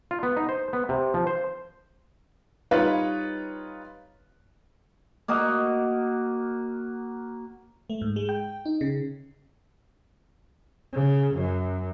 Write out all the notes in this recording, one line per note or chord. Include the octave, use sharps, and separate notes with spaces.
F4
B3
D#4
C5
B3
C3
F3
C5
G3 D#4 F4 B4 C#5 D#5
A#3 F#4 A#4 D#5
A3
G#2
G#3
G5
D#4
C#3
C#3
F#2